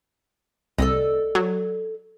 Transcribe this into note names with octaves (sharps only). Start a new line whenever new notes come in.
C2 A4 D5 D#5
F#3